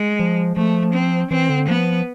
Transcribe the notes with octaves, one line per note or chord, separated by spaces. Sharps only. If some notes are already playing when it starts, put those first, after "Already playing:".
Already playing: G#3
F3
F3 A3
C4
E3 C4
D3
F3 B3